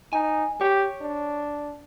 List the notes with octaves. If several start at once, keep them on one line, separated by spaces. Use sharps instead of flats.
D#4 G#5
G4 C#5
D4